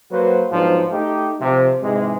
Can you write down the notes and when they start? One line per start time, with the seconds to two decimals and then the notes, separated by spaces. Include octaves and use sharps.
0.11 F#3 A#3 F#4 B4 C5
0.51 G#2 F3 F#3 B3 D4
0.91 A3 D#4 G4
1.40 C3 F3
1.81 G#2 C3 E3 G#3